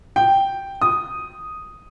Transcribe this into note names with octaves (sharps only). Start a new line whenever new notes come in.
G5
D#6